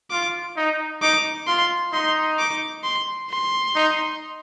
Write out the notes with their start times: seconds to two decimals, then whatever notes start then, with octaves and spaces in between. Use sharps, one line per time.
0.10 F4 D6
0.56 D#4
1.02 D#4 D6
1.47 F4 C6
1.93 D#4 C6
2.39 D6
2.84 C6
3.30 C6
3.75 D#4